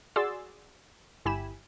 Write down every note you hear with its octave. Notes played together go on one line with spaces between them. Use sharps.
F#4 G#4 D5 C6 E6 A6
G1 E4 G4 G#5 B5 E7